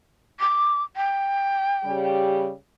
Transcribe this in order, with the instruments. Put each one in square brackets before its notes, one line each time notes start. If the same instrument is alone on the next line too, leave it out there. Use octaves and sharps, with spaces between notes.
[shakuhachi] D6
G5
[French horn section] C#3 G3 G4